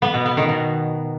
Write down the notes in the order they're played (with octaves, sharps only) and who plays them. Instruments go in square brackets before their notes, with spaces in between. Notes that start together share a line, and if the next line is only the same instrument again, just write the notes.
[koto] B3
B2
B3
D#3
B2